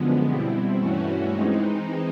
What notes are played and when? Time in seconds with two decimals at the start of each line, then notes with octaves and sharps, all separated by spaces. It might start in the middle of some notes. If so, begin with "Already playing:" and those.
Already playing: F#2 D3 F3 G#3 B3
0.26 B2 G3 C4 E4
0.78 G2 E3 A3 C#4 F#4
1.30 E3 G#3 C4 D#4